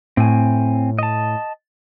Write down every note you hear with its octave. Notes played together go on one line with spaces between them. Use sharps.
A2 C4 G#5
D#5 A5